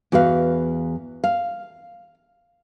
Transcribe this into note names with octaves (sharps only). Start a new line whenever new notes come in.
E2 F#4 B4 F5
F5